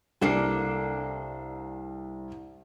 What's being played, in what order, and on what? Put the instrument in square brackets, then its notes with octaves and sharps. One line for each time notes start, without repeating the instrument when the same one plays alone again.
[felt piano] C2 C7 [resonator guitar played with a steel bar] A#3 D4 A4